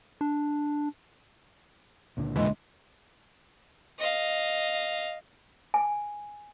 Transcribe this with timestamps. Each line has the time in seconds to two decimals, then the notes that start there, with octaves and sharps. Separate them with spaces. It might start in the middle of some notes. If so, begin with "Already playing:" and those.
0.21 D4
2.17 C#2 A#2 D3
2.36 F2 B2 E3 G#3
3.98 D#5 F5
5.74 G#5